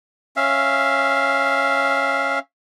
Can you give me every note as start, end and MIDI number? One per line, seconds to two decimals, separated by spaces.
0.37 2.39 61
0.37 2.39 76
0.37 2.39 77